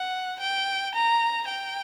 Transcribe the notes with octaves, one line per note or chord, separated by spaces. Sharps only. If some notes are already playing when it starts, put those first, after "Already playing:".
Already playing: F#5
G5
A#5
G5